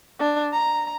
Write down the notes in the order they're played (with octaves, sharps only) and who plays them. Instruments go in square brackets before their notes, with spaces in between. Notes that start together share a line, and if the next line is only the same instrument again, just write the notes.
[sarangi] D4
A#5